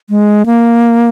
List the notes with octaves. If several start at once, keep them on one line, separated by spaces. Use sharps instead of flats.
G#3
A#3